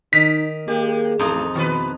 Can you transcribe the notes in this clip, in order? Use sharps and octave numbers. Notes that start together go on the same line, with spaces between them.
D#3 D#4 B6
G#3 A#3 G4
A1 F2 A3 D#4
B2 D#3 B4